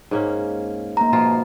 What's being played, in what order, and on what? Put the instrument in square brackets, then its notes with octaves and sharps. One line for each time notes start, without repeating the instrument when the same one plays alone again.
[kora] G#2 A#3 C#4
[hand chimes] A#3 A#5
[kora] B2 F3 F4